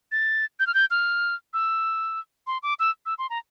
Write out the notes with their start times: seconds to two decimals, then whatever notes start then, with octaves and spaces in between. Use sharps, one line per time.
0.12 A6
0.60 G6
0.67 F6
0.74 G6
0.91 F6
1.54 E6
2.47 C6
2.63 D6
2.80 E6
3.06 E6
3.18 C6
3.30 A#5